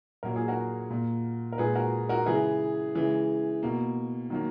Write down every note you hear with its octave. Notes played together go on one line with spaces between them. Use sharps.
A#2 F#3 A#3 A#4
G#4
F#4 A#4
A#2 A#3
A#4
A#2 G#3 G#4 B4
F#4 A#4
F#4 A#4
C#3 E3 G#3 G#4 B4
C#3 E3 G#3
B2 A#3
D#3 F#3 A#3